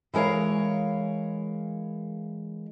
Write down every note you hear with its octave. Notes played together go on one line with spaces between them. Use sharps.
E3 G#3 A#4 C#5 F5